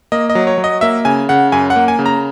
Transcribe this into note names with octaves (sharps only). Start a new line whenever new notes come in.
A#3 D#5
D#5
F#3
C#5
F#3
D#5
A#3 E5
C#3 G#5
C#3 F#5
F#2 G#5
F#5
A#3
G#5
C#3
A#5